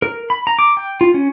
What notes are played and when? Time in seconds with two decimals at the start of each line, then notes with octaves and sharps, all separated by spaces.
0.02 A#4
0.30 B5
0.47 A#5
0.59 D6
0.77 G5
1.01 F4
1.14 C#4